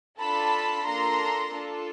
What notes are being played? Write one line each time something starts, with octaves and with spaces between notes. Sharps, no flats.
D4 F4 A4 A5 B5
A#3 D4 F4 A4 A#5 C6
D4 F4 A4